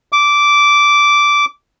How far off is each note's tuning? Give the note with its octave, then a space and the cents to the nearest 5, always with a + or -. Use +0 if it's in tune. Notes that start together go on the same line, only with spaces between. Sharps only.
D6 -10